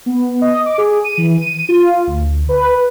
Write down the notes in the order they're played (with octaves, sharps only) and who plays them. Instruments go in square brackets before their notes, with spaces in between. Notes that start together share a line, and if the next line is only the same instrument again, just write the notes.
[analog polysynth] B3
D#5
D6
G#4
D#7
E3
D#7
F4
D2
B4